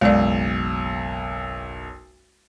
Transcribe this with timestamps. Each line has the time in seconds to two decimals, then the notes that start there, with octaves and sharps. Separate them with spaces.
0.01 F#1 B1 G#3 D5